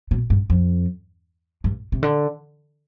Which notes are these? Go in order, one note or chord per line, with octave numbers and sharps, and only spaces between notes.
B2
G2
F2
G2
C3
D3